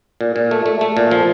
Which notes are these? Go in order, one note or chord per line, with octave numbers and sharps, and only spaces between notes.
A#2
A#2
A3
A3
A3
A#2
F3